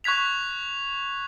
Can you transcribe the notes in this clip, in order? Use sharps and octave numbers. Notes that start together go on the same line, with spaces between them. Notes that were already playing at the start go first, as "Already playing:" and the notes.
C#6 F#6 G#6 B6 F7